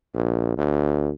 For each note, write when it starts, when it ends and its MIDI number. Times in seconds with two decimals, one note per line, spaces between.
0.15 0.55 34
0.57 1.11 38